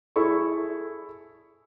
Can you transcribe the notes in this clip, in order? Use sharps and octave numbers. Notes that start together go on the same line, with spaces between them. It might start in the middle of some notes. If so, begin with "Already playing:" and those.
E4 G#4 A4 C#6